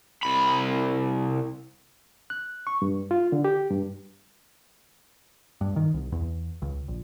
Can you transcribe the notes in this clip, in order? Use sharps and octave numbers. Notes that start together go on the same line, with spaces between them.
C2 B5
F#6
C#6
G2
F4
D3
G4
G2
G2
D#3
C2
E2
C#2
A#1